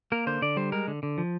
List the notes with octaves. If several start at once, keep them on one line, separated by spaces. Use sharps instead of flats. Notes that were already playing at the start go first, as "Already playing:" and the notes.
A#3 A#4
D3 C5
D3 D5
G3 C5
G#3 A#4
D3
D3
F3